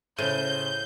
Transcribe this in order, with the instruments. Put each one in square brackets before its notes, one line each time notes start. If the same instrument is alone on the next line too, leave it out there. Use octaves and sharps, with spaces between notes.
[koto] A2 [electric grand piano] C#3 C5 D#7 [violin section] G6